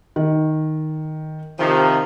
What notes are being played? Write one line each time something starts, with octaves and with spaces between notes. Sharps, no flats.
D#3
C3 D#3 F3